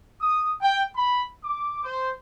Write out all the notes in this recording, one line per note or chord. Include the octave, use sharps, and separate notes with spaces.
D#6
G5
B5
D6
C5